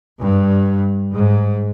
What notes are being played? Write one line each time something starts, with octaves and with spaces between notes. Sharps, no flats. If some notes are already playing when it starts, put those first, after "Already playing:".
G2
G#2